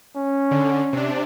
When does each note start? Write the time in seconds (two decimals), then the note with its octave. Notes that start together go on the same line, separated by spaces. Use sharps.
0.16 C#4
0.51 D3
0.93 C3 D4